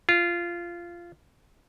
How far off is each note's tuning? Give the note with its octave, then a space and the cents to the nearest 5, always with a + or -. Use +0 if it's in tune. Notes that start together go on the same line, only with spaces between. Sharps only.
F4 -15